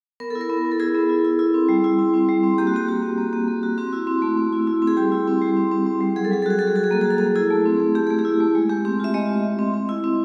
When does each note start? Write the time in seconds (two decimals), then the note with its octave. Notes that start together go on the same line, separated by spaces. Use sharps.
0.20 B3 A#4
0.30 E4 A4
0.41 A#4
0.50 B3
0.65 B3
0.72 A4
0.80 E4 G#4
0.95 B3
1.09 E4
1.25 E4
1.39 E4
1.54 C4
1.69 G3
1.84 E4
1.99 C4
2.14 C4
2.29 G3
2.43 C4
2.58 A#3 G4
2.67 F#4
2.73 A#3 G4
2.88 F#4
3.03 A#3
3.18 A#3
3.33 A#3
3.48 A#3
3.63 F#4
3.78 C4 F#4
3.93 E4
4.07 C4
4.22 A3
4.37 A3
4.53 E4
4.67 E4
4.82 C4
4.87 G#4
4.97 G3 G4
5.12 E4
5.27 C4
5.42 G3
5.57 C4
5.71 C4
5.86 C4
6.01 G3
6.16 F#3 G#4
6.25 A4
6.31 F#3 G#4
6.42 A4
6.46 F#4 G#4
6.59 F#4 A4
6.68 G#4
6.76 F#4 A4
6.84 G#4
6.91 A#3 A4
7.01 G#4
7.06 F#4 A4
7.18 A#3 G#4
7.36 E4 G#4
7.50 A3
7.65 C4
7.80 A3
7.95 A3 G4
8.07 A3 G#4
8.19 G4
8.25 E4
8.40 A3
8.55 G#3
8.70 G#3 G4
8.85 C4 G4
9.00 F4 E5
9.14 G#3 D#5
9.29 G#3
9.44 G#3
9.59 C4
9.74 C4
9.89 E4
10.04 C4